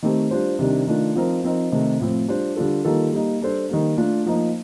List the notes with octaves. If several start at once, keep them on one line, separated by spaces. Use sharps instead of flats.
D#3 A3 C4 G4
G3 D4 F4 C5
C3 D#3 G3 D4
D#3 A3 D4 F4
F3 C4 D#4 A#4
F3 C4 D#4 A#4
C3 D#3 A3 D#4
A2 F3 C4
G3 D4 F4 C5
D3 G3 D4 F4 A4
D#3 G3 A#3 F4 A4
G3 A#3 D#4
G3 D4 A4 C5
D#3 G3 A#3
A3 D4 F4
F3 A#3 D#4